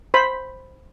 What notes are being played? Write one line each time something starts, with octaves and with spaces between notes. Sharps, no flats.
C5 B5